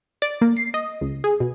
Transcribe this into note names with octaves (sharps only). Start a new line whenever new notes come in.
D5
A#3
C7
D#5
C#2
G#4
B2